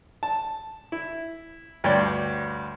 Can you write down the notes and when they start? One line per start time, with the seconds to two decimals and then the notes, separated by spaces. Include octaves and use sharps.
0.23 A5
0.92 E4
1.84 D2 G2 C#5 D5 G5